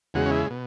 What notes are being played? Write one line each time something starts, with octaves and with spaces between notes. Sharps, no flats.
E2 C#3 G#3 F#4
C#4
E4
B2